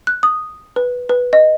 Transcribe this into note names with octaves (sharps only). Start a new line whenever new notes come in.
F#6
D#6
B4
B4
D#5